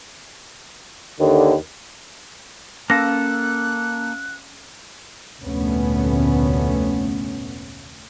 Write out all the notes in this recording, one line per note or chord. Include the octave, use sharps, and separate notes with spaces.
D#2 D3
A#3 C#4 A4 F5 E6 F#6 A#6
F1 D2 A#2 A3 B3 C#4